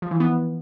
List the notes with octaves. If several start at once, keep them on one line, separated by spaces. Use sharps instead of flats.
F3
E3
B3